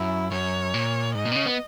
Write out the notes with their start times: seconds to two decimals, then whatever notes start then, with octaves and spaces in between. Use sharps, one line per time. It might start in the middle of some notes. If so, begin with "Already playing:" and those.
Already playing: F#2 E4
0.32 F#2 C#5
0.74 A#2
1.15 G#2 D#5
1.25 A#2
1.32 B2
1.36 C#3
1.46 B3